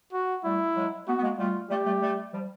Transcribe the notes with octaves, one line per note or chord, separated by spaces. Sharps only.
F#4
G3 A3 E4
F#3 G#3
A3 B3 F#4
B3
G#3 A#3
G3 A3 F4
G3 A3 G4
G3 A3
G3 A3
F3 G3